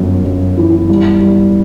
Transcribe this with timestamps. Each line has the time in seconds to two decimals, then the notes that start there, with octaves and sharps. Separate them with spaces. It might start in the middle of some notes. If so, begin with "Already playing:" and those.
Already playing: G1 F#2
0.25 F#2
0.57 E3
0.89 G3
1.21 G3